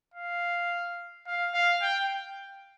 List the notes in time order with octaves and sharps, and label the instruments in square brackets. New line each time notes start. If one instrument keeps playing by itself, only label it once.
[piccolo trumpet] F5
F5
F5
G5